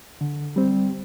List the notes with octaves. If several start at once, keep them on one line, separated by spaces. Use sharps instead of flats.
D3
G3 C4